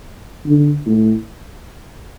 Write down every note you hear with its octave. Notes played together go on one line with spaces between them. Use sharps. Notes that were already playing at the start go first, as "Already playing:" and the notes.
D3
A2